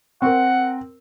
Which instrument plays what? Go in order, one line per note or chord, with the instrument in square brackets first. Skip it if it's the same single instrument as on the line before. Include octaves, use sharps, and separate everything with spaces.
[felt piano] C4 A#4 [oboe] F#5